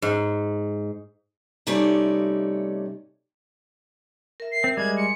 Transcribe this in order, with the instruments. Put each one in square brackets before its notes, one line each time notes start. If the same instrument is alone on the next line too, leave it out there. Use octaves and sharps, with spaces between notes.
[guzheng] G#2
[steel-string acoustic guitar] C3 G3 A3 C#4 D#4 D5
[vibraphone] A#4 E5
[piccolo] C7
[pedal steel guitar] C4
[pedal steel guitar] G3 G#3 [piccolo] G#6
[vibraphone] G#5 C6 [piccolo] C#7